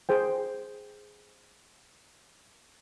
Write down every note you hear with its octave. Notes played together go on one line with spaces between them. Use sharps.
G#4 C5 G5